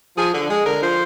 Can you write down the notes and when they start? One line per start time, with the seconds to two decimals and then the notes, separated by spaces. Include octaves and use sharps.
0.17 F3 G#4
0.33 D3
0.49 G#3 G#4
0.66 D3 A#4
0.82 F3 C5